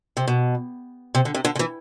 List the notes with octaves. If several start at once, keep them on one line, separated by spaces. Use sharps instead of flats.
C3
B2
C3
D3
C3
D3
D3
E3